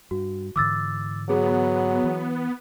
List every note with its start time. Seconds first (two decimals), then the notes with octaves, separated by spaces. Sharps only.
0.11 G2 F#4
0.56 G#2 D3 E3 D6 E6 A6
1.29 F#3 B3 G#4
2.04 E3